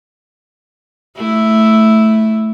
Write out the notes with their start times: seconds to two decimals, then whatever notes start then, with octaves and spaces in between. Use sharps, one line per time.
1.17 A3 E4